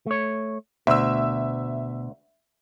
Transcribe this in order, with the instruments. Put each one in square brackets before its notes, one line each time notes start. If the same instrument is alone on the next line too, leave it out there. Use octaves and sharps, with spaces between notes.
[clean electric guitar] A3 C#5
[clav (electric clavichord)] D2 [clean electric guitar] B2 [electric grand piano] E5 E6